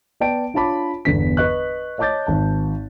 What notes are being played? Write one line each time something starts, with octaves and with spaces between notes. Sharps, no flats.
B3 D5 G5 A5 D7
D4 F4 C#5 A5 B5 D6
G1 E2 D3 E3 B6
B4 D#5 C#6 F#6
C#5 D#5 A5 D6 G6 A6
G#1 A5